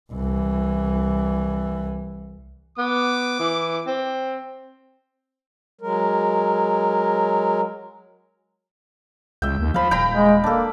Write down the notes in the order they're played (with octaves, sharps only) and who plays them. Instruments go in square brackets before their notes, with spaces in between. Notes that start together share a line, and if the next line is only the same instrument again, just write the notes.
[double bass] C2 E3
[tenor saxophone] B3 [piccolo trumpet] D6
[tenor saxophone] E3
C4
[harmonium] F#3 G#3 A#4
[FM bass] C#2 [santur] E5 G5
[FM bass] D#2
[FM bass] F3 [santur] F5 B5
[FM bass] D#1 [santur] G5 A#5 B5
[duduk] G#3
[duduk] A#3 [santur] D4 A4